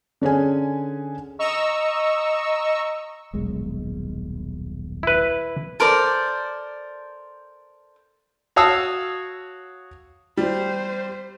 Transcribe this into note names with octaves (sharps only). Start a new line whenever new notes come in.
D3 C#4 G#4 G#5
D#5 A#5 C#6 E6
D#1 B1 G#3
E4 B4
A4 A#4 C5 D5
F#4 C#5 F5 A5 D#6 E6
G3 C5